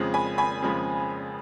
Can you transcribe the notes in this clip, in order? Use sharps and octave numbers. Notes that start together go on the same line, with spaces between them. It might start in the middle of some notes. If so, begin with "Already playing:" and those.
Already playing: F2 C#3 F3 G#3
G#5 B5
G#5 B5
F2 C#3 F3 G#3